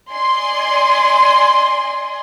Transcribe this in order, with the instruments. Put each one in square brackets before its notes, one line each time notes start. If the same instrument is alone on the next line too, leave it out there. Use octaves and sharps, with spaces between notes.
[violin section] D5 D#5 G#5 C6